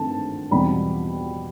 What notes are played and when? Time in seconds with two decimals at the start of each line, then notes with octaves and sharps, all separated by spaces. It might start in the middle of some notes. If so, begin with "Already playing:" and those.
Already playing: G2 D#3 A3 C4 A5
0.51 E2 B2 G3 C4 B5